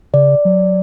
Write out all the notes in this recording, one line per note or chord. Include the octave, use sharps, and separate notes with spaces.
C#3 D5
F#3